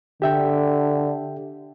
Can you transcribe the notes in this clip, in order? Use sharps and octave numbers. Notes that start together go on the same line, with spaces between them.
D3 G4 E5 G5